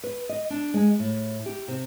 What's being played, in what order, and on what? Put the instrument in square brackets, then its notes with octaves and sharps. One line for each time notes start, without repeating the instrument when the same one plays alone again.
[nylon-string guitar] B4
D#5
D4
G#3
A2
G4
C3